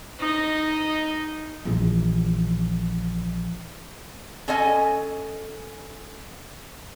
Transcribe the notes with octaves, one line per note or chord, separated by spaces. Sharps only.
D#4 D#5
A#1 E3
C#4 A4 D#5 G#5